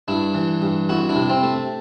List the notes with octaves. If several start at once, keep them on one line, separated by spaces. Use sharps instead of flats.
G2 D4 E4
E3
G2
F2 E4 F#4
D4 E4
C3
C4
A3